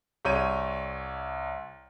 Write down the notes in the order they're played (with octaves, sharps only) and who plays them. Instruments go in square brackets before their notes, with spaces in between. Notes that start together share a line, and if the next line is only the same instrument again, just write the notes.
[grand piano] C2 C#5 G6 D#7